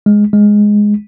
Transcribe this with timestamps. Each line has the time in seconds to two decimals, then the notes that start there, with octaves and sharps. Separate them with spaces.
0.06 G#3
0.33 G#3